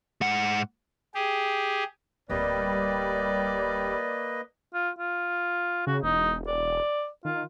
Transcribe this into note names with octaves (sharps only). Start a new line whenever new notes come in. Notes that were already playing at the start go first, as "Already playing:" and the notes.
G#2 F#5
G4 G#4
D1 G3 A#3 C4 B4 D5 D#5
F4
F4
C#3 F#4
E1 D#4
D5
D#3 F4